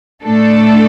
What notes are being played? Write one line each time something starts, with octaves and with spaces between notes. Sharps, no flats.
A2 A3 D4 A4